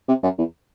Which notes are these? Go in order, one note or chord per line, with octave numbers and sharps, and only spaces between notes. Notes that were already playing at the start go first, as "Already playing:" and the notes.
C3
F#2
E2